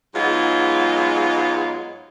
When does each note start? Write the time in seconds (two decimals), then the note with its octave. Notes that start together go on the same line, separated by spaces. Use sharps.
0.15 G#2 F#3 G#3 B3 F4